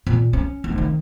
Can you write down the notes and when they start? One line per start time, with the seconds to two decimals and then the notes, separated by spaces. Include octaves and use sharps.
0.07 A#2
0.33 C#4
0.64 F1
0.78 D#3